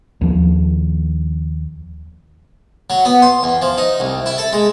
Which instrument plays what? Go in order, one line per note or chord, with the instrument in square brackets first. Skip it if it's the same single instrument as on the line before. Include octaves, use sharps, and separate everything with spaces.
[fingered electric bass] D#2 F3
[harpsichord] F#3
B3
C6
E2
F3
D#4
C2
E4
A4
G#3